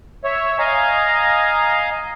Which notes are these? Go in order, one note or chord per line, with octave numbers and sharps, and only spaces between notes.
C#5 E5
D#5 F5 G#5 A#5